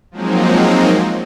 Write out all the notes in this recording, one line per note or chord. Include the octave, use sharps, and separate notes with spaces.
F3 F#3 G#3 A#3 C4 D#4